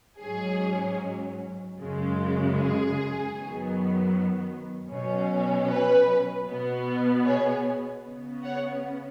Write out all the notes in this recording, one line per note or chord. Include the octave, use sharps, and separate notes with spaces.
G#2 F#3 C#4 G#4
F#2 C#3 G#3
G#4
F#2 D#3 F#3 B3
B2 F#3 C#4
B4
B2 B3
G#4 C#5
C#3 B3
C#5 F#5